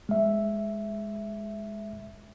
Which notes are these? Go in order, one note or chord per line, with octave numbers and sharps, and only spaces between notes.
G#3 E5